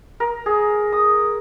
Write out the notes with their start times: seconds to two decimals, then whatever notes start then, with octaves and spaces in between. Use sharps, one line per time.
0.20 A#4
0.46 G#4
0.92 D#6